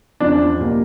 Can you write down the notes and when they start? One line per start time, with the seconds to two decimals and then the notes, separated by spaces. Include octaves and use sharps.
0.20 E2 C#3 F3 D4
0.60 B2 G3 A#3